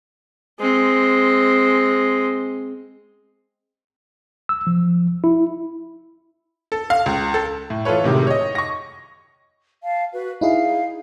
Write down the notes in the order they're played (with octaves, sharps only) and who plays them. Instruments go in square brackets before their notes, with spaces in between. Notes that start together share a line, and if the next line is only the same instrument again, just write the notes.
[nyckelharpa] G#3 C4
[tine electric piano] E6
F3
E4
[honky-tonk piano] A4
F5
C#2
A4
A2
E3 F4 A4 B4 C#5
A2 C3 D#3 G#3
C#5 D#5
C#6 A#6
[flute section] F5 A5
F#4 B4
[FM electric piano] D#4 E4 G#4 [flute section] F5